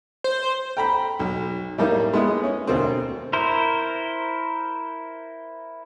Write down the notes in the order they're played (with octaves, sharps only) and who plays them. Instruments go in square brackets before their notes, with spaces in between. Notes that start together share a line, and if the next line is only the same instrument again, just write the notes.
[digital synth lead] C5
[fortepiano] G5 A#5 B5
B1
A2 G3 A#3 D#4
G#3 B3 E4 D#5
C#4
D2 B2 A#3 C4
[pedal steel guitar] E4 A#4 C5